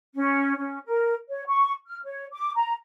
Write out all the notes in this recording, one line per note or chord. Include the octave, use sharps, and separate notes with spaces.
C#4
C#4
A#4
C#5
C#6
F6
C#5
D6
A#5